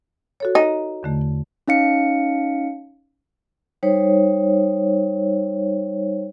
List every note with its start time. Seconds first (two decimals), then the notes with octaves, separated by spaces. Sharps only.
0.40 F#4 A4 C#5
0.55 D#4
1.03 E2 D3 A3
1.68 C#4 D#4 F5 C#7
3.83 G3 D#4 C5 C#5